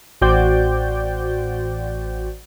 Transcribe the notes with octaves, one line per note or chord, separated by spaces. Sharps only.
A1 F#4 C5 D5 G5 G6